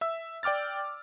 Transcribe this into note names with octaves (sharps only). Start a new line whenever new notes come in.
E5 E6
D5 G5 D6 F6 A6